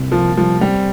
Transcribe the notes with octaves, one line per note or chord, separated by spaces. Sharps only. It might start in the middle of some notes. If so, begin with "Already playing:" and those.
Already playing: C2 C3 G3 A#3
F3 A#3
F3 G3
G3 C4